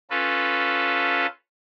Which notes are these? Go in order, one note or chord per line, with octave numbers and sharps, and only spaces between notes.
C#4 F4 A4 B4